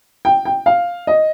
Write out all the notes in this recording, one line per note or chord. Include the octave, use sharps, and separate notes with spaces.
G5
G5
F5
D#5